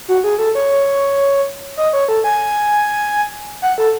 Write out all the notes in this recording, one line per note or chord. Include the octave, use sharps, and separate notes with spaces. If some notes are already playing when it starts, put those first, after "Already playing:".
F#4
G#4
A4
C#5
D#5
C#5
A4
G#5
F#5
A4